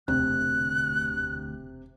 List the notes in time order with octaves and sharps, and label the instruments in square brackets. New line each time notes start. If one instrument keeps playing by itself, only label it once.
[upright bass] E1 [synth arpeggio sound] D2 [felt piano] C3 [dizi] F#6